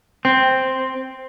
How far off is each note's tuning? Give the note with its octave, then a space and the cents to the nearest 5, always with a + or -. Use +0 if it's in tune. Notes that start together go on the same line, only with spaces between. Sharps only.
C4 +0